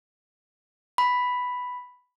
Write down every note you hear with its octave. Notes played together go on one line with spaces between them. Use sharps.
B5